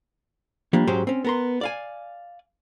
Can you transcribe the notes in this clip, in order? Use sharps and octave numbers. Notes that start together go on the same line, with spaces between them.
F3 G3 A#3 D4
G#2 F#3 G#3 C#4 G4 C5
C4 C#4
B3 A#4 C6
D5 F5 G#5